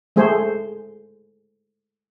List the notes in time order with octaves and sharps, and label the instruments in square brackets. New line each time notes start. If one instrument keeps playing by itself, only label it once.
[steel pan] G#3 A3 G#4 C5